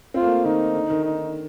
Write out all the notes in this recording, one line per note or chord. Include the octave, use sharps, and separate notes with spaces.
C4 F4
A3
A#3
D#3 D#4
D3
D#3
D#4